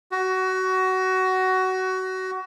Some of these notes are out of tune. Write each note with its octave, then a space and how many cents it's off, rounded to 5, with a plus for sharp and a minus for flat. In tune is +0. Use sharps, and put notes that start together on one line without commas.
F#4 +20